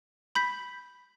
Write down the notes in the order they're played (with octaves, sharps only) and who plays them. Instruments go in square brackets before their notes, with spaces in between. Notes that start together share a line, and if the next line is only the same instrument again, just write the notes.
[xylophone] B5 G6 B6